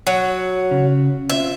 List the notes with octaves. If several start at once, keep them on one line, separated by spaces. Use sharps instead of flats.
F#3
C#3
C4 F4 E5